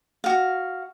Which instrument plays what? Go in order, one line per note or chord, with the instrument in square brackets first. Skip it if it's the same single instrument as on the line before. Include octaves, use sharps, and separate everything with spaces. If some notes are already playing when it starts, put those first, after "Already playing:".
[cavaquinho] F#4 F5